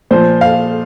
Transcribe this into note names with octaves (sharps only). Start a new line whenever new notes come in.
A#2 F3 C5
F5